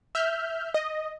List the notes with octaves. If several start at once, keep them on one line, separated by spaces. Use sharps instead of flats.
E5 F6 G6
D#5